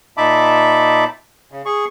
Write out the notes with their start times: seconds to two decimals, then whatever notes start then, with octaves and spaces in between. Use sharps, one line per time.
0.17 A#2 D#4 E5 A5 B5 D6
1.52 C#3
1.65 G#4 C#6